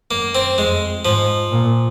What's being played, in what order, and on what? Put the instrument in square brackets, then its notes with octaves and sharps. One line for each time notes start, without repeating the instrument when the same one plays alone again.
[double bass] F#2 [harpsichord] A#3
[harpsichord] C4
[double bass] F2 [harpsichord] G#3
[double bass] G#2 [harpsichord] F3
[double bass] A#2